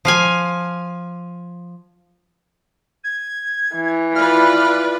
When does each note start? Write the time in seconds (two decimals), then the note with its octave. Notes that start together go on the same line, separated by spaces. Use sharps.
0.05 F3 F5 G#5
3.04 G#6
3.75 E3
4.15 F4 B4 D5 F6